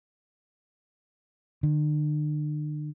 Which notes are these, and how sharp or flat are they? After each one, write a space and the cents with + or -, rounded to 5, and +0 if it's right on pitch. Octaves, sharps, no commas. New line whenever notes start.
D3 +45